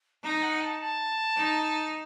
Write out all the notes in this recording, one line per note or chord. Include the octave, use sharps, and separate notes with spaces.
D#4 A#5
F#5
A5
A5
D#4